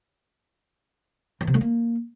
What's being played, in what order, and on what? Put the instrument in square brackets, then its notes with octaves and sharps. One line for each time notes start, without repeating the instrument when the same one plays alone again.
[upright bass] E3
C3
A3
A#3